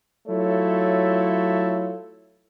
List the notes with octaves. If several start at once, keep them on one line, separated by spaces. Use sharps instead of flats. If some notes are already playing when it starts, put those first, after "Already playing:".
F#3 A3 E4 F4 A4 C#5